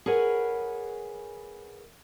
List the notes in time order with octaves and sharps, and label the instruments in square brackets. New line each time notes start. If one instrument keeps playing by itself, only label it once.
[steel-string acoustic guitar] G#4 A#4 B4 C#5 F#5 G#5